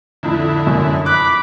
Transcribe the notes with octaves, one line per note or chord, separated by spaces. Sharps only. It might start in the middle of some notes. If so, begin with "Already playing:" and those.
F2 A2 D3 E4
F#2
B5 D6 F#6